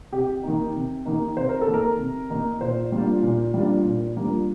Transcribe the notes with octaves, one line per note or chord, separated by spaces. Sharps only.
C3 G4
D#3 A#3 D#4
C3
D#3 A#3 D#4
C3 C5
A#4
A4
D#3 A#3 D#4
A#4
C3
D#3 A#3 D#4
A#2 C5
G3 A#3 D4 F4
A#2
G3 A#3 D4 F4
A#2
G3 A#3 D4 F4